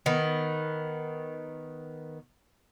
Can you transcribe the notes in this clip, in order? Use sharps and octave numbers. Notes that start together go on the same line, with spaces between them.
D#3 B3